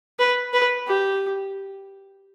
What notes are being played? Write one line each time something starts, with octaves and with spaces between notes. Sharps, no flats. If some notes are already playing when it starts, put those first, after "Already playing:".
B4
B4
G4